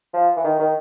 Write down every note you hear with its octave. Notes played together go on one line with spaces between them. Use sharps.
F3
E3
D#3
D#3